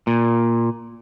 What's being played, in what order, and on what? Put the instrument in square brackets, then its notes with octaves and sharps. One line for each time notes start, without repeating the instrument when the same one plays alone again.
[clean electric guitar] A#2